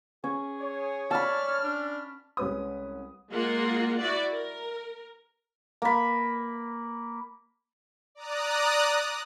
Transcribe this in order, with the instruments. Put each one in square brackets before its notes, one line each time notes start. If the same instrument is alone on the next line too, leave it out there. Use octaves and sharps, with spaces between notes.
[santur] C#4 [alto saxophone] G#4
[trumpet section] C#5
[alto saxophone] D5 [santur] A5 B5 [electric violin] F6
[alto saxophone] D4
[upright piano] C2 G#3 C#4 B4 D#6
[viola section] G#3 A#3 F4 A#4 F#5
E4 F#4 D5
A#4
[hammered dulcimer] A#3 B5
[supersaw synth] D5 A#5 D#6 F#6